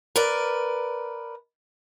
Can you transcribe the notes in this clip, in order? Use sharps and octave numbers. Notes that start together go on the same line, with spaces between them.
A#4 B4 D5